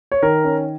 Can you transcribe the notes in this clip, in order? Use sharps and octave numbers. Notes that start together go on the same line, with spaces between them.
C#5
D#3 A#4
C#4